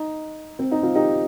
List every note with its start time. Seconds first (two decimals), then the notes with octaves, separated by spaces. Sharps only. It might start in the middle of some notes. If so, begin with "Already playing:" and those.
Already playing: D#4
0.59 C4
0.71 D#4
0.82 C4 F4
0.95 D#4 G4